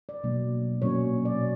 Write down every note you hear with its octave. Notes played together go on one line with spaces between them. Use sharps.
D5
B2 F#3 A#3 D4
A#2 F#3 A#3 C#4 C#5
D5
B2